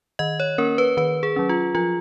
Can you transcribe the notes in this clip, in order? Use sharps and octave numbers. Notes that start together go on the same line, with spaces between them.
D#3 D#5
C#5
A#3 C#4 A#4
B4
D#3 B4
G#4
F#3 C#4
F4
F3 F4